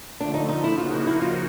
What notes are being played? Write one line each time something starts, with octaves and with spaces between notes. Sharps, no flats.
D3 F3 A3 D4
D#4
D#4
E4
C#3 F3 A#3 D#4 F4 F#4
E4
E4
F4